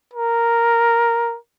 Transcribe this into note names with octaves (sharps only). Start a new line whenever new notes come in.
A#4